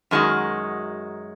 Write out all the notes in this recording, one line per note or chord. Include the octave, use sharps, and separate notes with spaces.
F#2 D#3 G#3 F#4